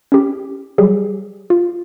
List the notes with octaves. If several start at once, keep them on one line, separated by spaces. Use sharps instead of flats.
C#4 E4 G4
F#3 G3 G4 G#4
F4